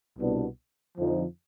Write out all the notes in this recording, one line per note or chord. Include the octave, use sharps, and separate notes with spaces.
C2 B2 B3 D4
F2 D3 F3 C4 D#4